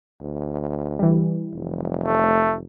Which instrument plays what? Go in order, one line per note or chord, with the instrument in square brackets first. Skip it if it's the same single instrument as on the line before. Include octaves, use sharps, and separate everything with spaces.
[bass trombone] D2
[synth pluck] E3 G3
[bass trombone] F1
[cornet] A3